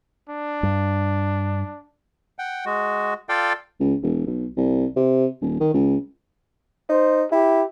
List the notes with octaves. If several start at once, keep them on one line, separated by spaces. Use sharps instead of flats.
D4
G2
F#5 G5
G#3 F#4
F4 A4 D5 F5 G5
C#2
E1
B1
C2
C3
D#1
D#3
C#2
D#4 C5
E4 G4